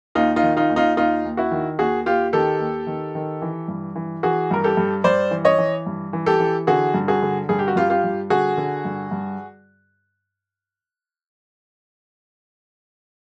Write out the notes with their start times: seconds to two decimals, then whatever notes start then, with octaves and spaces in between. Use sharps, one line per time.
0.15 D#2 D#4 F4
0.36 D#4 F4
0.43 D#3
0.57 D#4 F4
0.70 D#2
0.76 D#4 F4
0.97 D#2 D#4 F4
1.25 D#2
1.37 E4 F#4
1.51 D#3
1.79 D#2 F#4 G#4
2.06 D#2 F4 G4
2.33 D#3 G4 A4
2.60 D#2
2.87 D#3
3.15 D#3
3.42 E3
3.68 G2
3.96 E3
4.23 E3 F#4 G#4
4.51 G2 A#4
4.64 G4 A4
4.77 G2
5.04 G2 C5 D5
5.31 E3
5.45 C#5 D#5
5.58 E3
5.86 G2
6.13 E3
6.26 G4 A4
6.40 E3
6.67 D3 F#4 G#4
6.94 G2
7.08 F#4 G#4
7.22 D3
7.49 G2 G#4
7.59 G4
7.68 F#4
7.76 G2 F4 G4
7.90 F4 G4
8.04 G2
8.30 D3 F#4 G#4
8.57 D3
8.85 G2
9.11 G2